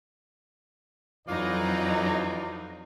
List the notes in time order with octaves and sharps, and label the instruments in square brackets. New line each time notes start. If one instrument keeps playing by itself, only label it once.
[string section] F2 F#3 D#4 [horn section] E3 F4 D5